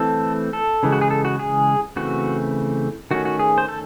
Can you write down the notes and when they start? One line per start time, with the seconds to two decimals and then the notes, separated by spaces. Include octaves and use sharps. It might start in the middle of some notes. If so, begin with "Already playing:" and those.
Already playing: E3 A3 C4 A4
0.53 A4
0.83 C#3 E3 G#3
0.92 F#4
1.01 G#4
1.11 A4
1.25 F#4
1.39 G#4
1.96 C#3 E3 A3 C4 F#4
3.11 D#3 A3 C#4 F#4
3.25 F#4
3.39 G#4
3.58 C5
3.68 A4